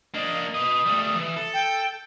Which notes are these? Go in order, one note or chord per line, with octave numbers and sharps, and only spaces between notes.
A#3 D4 D#5
B4 D#5 D#6
G3 A3
E3
A4
G5